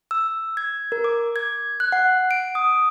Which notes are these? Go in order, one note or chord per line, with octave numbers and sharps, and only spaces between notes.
E6
G#6
A#4
D6
G#6
F#6
F#5
D7
D#6